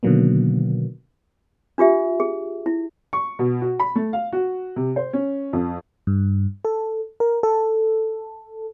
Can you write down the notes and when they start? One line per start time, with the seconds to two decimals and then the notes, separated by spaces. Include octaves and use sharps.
0.03 B2 D3 D#3 F#3 A#3 B3
1.78 D4 F4 G4 E5
2.20 G#4
2.66 E4
3.13 C#6
3.39 B2
3.61 F#4
3.79 B5
3.95 A3
4.13 F5
4.33 F#4
4.76 C3
4.96 C5
5.13 C#4
5.53 F2
6.07 G2
6.65 A4
7.20 A#4
7.43 A4